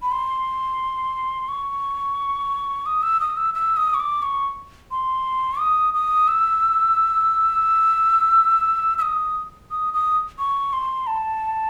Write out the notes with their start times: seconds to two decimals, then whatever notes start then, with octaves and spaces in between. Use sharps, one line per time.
0.02 B5
0.12 C6
1.48 C#6
2.86 D#6
3.02 E6
3.20 D#6
3.37 E6
3.54 E6
3.77 D#6
3.94 C#6
4.00 D6
4.22 C#6
4.91 C6
5.60 D#6
5.94 D#6
6.28 E6
8.98 E6
9.02 D#6
9.71 D#6
9.94 D#6
10.39 C#6
10.73 C6
11.07 A5